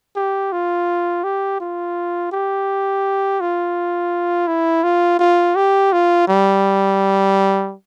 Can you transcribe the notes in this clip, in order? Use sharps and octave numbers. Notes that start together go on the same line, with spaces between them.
G4
F4
G4
F4
G4
F4
E4
F4
F4
G4
F4
G3